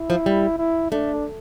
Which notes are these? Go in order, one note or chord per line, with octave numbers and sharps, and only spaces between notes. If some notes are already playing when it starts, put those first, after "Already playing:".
Already playing: E4
F3
G3
E4
A3 D4